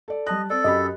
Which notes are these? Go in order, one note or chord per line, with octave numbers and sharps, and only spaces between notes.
A4 D5
G3 D#5 A5 F#6
C4 A4 D5
F#2 G4 D#5 B5